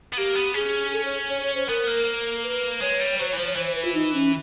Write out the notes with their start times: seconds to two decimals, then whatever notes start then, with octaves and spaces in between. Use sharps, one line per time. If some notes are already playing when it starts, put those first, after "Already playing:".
0.13 B3
0.17 A#3 G4
0.35 B3
0.54 C#4 G#4
0.93 A4
1.05 C#5
1.30 C#5
1.43 C#5
1.55 C5
1.68 B3 A#4
1.87 A#3
2.43 B4
2.81 G#3 C#5
3.00 G3
3.19 F#3 C5
3.29 C#5
3.33 E3
3.37 F3 C5
3.47 C#5
3.56 E3 C5
3.66 C5
3.75 B4
3.85 F4
3.94 D#4
4.14 C#4